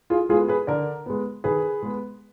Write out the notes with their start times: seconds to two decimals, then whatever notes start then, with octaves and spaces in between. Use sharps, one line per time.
0.10 F4 G#4
0.29 G#3 B3 F4 G#4
0.48 G#4 B4
0.67 D3 A#4 D5
1.06 G#3 B3
1.44 D#3 G#4 B4
1.83 G#3 B3